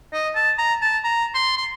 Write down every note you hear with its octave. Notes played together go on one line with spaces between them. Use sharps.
D#5
A5
A#5
A5
A#5
C6
C6